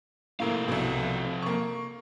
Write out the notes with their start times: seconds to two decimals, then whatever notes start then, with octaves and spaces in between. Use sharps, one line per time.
0.40 A2 C3 A#3 A4 F5
0.68 C2 B2
1.43 A#3 C#6